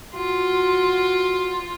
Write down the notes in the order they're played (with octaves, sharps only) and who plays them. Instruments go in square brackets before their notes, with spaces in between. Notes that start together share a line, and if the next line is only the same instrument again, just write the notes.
[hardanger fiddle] F4 [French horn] F#4